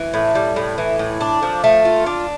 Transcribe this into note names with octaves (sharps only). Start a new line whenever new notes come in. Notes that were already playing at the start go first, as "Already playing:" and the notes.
Already playing: E3
A2
G3
A2
E3
A2
D4
F3
A3
F4
D4